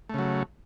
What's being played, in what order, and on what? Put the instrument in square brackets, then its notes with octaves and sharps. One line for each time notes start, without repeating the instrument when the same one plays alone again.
[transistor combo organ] A3
C#3
F#3